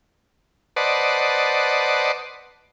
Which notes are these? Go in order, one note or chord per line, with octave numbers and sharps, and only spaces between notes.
B4 C5 D5 D#5 F#5 A5